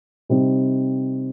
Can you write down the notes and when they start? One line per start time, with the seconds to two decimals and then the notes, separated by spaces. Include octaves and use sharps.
0.29 C3 G3 C4 D#4